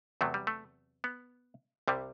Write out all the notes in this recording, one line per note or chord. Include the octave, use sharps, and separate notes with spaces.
E2 C3 F#3 A3
G3
A3
B3
C2 C3 G3